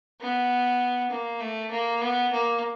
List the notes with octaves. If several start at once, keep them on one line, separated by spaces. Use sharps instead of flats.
B3
A#3
A3
A#3
B3
A#3